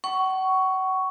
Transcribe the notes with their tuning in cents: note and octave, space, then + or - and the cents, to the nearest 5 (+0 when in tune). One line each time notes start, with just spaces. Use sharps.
F#5 +35 C#6 +5